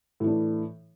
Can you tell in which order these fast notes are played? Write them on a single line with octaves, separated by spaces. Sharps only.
A2 E3 D4